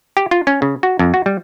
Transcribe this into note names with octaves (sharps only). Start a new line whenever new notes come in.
G4
F4
C#4
C#3
F#4
F2
F#4
G3